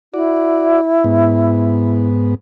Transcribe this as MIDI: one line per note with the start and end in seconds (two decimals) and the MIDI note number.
0.14 2.06 64
0.14 0.81 66
0.14 0.81 74
1.04 2.35 44
1.04 2.35 59